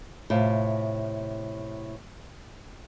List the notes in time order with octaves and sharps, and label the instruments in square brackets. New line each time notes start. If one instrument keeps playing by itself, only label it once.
[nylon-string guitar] A2 C3 F4